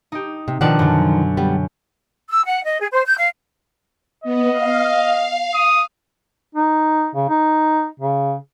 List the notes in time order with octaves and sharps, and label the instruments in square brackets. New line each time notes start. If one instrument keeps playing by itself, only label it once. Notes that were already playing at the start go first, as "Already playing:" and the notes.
[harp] D#4 G4
[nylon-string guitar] C3
[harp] B2 D4 F#5 [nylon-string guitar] D#3 F3 D5
[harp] F#2 D3
[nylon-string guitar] G3 B3
[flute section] E6
F#5
D#5
G#4
C5
G6
F5
[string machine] B3 [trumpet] D#5
[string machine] F5
[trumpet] D#6
[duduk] D#4
C#3
D#4
C#3